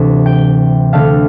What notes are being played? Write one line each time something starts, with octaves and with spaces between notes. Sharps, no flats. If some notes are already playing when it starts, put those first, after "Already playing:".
Already playing: D2 C3 E3
G5
D2 D3 A3 F5